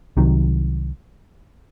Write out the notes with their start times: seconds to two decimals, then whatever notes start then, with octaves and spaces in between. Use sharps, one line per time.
0.17 C2 C3 D#3 F#3